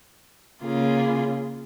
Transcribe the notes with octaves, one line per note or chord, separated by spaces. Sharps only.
C#3 A#3 F4 G#4